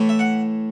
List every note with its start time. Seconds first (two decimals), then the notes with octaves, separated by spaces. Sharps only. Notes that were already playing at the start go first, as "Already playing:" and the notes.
Already playing: A2 E3 A3
0.09 E5
0.19 F#5